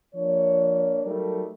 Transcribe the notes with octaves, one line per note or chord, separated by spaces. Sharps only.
F3 A#3 D4 C#5
F#3 G3 A3 D#4 A4 A#4